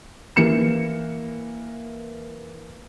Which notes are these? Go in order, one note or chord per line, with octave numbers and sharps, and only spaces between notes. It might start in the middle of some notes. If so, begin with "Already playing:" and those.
E3 A#3 C#7 E7